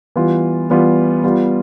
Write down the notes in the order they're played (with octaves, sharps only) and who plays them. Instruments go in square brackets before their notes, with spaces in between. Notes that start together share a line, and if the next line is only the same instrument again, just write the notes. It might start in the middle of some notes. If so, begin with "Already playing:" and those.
[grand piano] E3 G3 B3 F4
E3 G3 B3 F4
G3 B3 F4